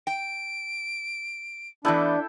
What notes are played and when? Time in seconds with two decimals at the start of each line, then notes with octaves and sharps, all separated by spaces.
0.07 G5 D7
1.85 E3 A3 B3 D4 E4 A4 G5